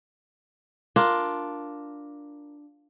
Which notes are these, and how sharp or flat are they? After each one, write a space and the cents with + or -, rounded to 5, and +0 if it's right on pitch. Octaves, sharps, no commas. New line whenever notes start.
D4 +0 F4 +0 A#4 +0